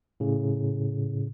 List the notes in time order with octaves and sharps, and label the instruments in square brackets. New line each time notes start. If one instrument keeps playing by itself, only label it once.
[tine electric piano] A2 C#3